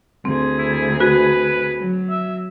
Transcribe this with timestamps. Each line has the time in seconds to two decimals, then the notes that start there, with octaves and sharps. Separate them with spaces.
0.25 D2 C4 G#4
0.58 E4
1.00 F#4 B4
1.80 F#3
2.10 E5